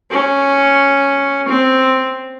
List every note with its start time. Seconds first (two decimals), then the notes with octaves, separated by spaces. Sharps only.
0.11 C#4
1.48 C4